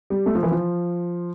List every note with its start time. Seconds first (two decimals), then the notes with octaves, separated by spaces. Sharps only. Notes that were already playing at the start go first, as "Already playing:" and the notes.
0.10 G3
0.26 A3
0.35 F3
0.43 E3
0.51 F3